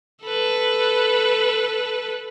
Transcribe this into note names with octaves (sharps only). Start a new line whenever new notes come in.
A4 B4